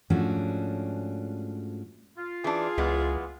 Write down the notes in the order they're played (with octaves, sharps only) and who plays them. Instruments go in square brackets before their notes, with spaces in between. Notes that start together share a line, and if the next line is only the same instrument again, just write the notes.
[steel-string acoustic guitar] G#2 F3 A3 C#4 D4 F#4
[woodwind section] F4
[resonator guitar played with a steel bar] E3 D4 [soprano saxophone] G#4
[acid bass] C#2 [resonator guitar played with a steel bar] E3 G#3 B3